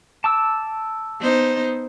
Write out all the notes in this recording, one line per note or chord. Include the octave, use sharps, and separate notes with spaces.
A5 D6 E6
B3 D#4 C5